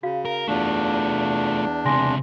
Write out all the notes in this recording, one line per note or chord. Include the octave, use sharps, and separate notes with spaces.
C#3 F#4 F5
A#4
E2 A3 D4 F4
C#2 C3 G#5 C6 A#6